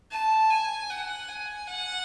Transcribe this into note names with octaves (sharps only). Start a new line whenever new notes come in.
A5
G#5
F#5
G#5
F#5